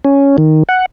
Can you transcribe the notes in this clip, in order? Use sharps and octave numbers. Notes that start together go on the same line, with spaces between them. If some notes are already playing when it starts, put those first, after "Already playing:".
C#4
D#3
F#5